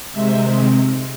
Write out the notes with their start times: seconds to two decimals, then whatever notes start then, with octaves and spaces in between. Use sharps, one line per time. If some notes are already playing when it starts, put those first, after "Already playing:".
0.11 C3 D#3 G#3 C4 E5